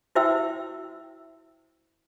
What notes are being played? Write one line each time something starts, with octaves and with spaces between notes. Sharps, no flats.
E4 F#4 C5 E5 G5 E6